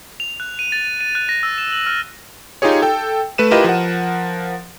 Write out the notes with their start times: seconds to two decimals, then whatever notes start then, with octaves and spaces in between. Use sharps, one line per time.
0.20 F7
0.40 F#6
0.59 D#7
0.72 A6
0.85 D#7
1.01 D#7
1.15 F#6
1.29 A#6
1.43 E6
1.58 E7
1.72 F#7
1.86 F6
2.62 D#4 F4 G4 G#4 C#5
2.82 A4 G5
3.38 A3 B4 D#7 E7
3.51 E4 F4 G4 A#4 B4 D#5
3.64 F3 A#4 F#5